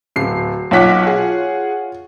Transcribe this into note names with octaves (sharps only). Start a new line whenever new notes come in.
D1 C7
B1 F4 C#5 F#5 D6 B6
G#4 F#5